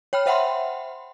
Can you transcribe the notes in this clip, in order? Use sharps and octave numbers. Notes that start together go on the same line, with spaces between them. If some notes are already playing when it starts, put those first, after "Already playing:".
C#5 G5 B5 F6
C5 E5 F#5 G5 B5 C6